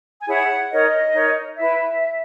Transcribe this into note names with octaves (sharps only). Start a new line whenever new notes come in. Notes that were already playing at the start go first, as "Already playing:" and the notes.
G#5
E4 G#4 C#5 F#5
D#4 A#4 C#5 D#5
D#4 A#4 C#5
E4 B4 E5